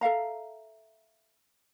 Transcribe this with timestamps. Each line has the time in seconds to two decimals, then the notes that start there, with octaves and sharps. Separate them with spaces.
0.01 A4 E5 F5 A#5